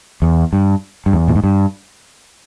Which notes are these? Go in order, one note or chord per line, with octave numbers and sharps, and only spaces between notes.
E2
G2
G2
E2
A#2
G#2
G2